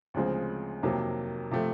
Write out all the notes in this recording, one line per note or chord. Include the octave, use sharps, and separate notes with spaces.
D2 C#3 F3 G#3 C4
F2 C3 D#3 F#3 A#3
C3 F3 A3